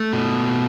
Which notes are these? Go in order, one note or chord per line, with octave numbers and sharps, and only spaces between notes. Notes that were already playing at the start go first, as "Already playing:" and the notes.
Already playing: A3
B2